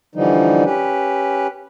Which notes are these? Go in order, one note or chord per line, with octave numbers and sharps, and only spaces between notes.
D3 E3 F3 G3 D#4
C#4 G4 B4